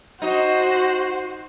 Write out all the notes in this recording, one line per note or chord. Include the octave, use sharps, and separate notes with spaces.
D#4 F#4 C5